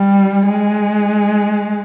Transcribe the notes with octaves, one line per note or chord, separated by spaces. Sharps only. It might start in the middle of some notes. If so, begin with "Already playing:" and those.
Already playing: G3
G#3